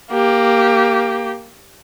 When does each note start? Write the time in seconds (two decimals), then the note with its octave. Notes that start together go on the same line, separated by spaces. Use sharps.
0.11 A#3 G4